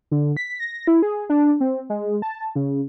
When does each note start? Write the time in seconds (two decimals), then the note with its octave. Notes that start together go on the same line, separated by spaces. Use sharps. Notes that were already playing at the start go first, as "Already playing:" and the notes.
0.11 D3
0.37 B6
0.60 A#6
0.87 E4
1.02 G#4
1.30 D4
1.60 C4
1.90 G#3
2.22 A5
2.55 C#3